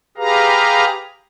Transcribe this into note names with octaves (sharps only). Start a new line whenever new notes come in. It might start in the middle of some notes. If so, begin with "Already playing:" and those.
G4 G#4 B4 F5 A#5